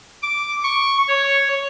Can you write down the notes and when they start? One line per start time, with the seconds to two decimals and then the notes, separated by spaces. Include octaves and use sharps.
0.23 D6
0.64 C#6
1.08 C#5